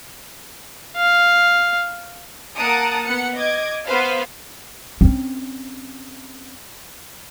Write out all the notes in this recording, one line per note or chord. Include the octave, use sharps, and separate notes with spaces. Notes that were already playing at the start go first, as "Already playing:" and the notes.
F5
A#3 F#5 A5 A#5 D#6 D7
B3 F#5 C#7
D#5 D6 G#6
B3 B4 C5 F5
C4 C#4